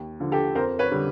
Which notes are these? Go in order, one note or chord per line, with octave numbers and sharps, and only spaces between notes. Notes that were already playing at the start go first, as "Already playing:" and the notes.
Already playing: D#2
D3 F3
G4 A4
F2 A#4 C5
B4 C#5
D3 G3